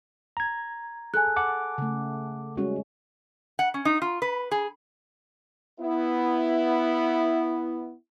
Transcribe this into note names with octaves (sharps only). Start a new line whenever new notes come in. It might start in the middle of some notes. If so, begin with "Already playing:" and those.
A#5 G#6
G#4 A4 G#5 F#6
F#5 A5 D6
C#3 A3
G3 G#3 C#4 F#4
F#5
C#4
D#4
F4
B4
G#4
B3 E4